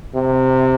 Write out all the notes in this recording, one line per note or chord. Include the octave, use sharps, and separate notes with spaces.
C3